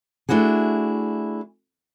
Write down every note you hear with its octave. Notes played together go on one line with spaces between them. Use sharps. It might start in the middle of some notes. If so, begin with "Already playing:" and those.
A3 D4 E4 F#4 G#4